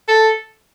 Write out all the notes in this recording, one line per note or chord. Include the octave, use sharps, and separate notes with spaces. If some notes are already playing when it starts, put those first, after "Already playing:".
A4